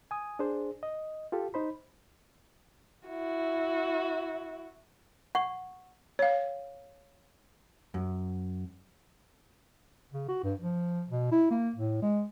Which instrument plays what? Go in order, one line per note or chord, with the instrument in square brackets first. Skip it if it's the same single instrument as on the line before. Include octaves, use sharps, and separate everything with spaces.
[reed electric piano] G#5 D#6
D4 G#4 C5
D#5
F4 G4 A4
D#4 C5 B5
[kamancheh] E4 F#4
[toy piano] F#5 C#6
[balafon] C#5 F5
[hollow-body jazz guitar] F#2
[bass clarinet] C#3
F#4
G2
F3
B2
E4
A#3
A2
G#3